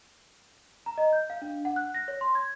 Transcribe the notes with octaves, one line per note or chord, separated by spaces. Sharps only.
A#5
D#5
G6
F5
D4
F#5
F#6
A#6
C#5
C6
G#6